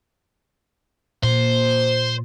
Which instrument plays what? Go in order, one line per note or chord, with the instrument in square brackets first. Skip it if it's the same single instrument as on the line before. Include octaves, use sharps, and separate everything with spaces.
[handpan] A#2 [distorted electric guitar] C5